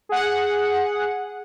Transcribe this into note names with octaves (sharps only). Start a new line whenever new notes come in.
G#4 F#5